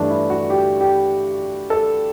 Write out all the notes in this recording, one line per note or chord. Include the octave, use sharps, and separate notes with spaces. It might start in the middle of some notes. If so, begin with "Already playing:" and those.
Already playing: G2 E3 A3 D4
E4
F#4
G4
G4
A4